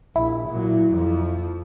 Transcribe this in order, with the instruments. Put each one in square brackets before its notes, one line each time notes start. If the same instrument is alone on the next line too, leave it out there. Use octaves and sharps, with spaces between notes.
[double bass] A#1 [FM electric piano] E4
[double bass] A#2 F#3
F2 F3